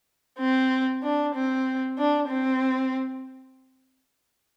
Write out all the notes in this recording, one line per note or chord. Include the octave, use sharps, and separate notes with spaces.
C4
D4
C4
D4
C4